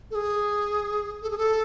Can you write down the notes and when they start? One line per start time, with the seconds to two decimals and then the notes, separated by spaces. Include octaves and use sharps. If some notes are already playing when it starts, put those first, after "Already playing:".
0.11 A4
0.15 G#4
1.22 A4
1.31 G#4
1.38 A4